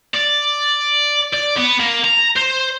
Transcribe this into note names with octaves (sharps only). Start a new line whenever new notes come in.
D5
D5
B3
A#3
A#5
C5